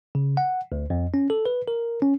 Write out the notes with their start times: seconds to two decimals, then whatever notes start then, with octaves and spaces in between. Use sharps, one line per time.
0.15 C#3
0.37 F#5
0.72 D2
0.90 F2
1.14 C#4
1.30 A4
1.46 B4
1.68 A#4
2.02 C#4